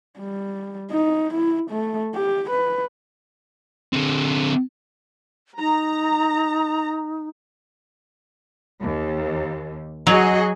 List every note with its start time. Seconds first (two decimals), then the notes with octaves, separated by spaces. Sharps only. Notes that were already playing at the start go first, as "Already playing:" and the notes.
0.19 G3
0.91 D#4
1.34 E4
1.71 A3
2.15 G4
2.50 B4
3.93 D3 C4
5.59 D#4 A#5
8.82 D#2
10.07 F#3 F#4 G#4 D#5